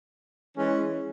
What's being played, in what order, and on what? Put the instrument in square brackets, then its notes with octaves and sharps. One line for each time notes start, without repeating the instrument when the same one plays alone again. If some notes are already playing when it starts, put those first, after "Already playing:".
[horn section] E3 G#3 C#4